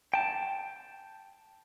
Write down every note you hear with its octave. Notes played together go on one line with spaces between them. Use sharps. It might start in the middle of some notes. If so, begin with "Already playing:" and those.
G5 A5